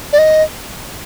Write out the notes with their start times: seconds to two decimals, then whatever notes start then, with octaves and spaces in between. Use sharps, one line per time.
0.13 D5
0.18 D#5